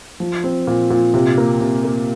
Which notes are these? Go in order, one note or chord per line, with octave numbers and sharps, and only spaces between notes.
F3
C4
A#2
A#2
C3
A#3
C3
A#3